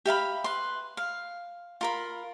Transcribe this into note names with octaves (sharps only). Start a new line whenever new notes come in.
G4 E5 F5 B5
B4 C6
F5
F4 A#4 B5